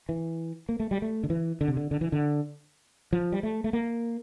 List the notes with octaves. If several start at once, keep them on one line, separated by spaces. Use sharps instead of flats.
E3
A#3
A3
G3
A3
D3
E3
D3
C3
D3
D3
E3
D3
F3
G3
A3
A3
A#3